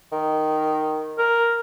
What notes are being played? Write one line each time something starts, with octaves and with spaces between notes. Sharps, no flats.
D#3
A#4